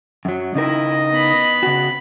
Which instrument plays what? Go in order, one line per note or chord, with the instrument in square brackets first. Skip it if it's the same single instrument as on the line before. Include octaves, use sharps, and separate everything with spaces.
[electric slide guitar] F#2 F#3
[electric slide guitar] C#3 D#4 A#4 [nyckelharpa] E4 [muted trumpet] D#5
[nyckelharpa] B3 B5
[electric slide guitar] C#3 F#4